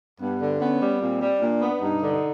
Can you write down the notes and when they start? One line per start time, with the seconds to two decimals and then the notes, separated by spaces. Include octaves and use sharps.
0.20 G2 B3
0.40 D3
0.61 B3 C#4
0.80 G3
1.01 A#2 C4
1.21 G3
1.41 A#2 D4
1.61 B3
1.81 G2 D#4
2.01 D3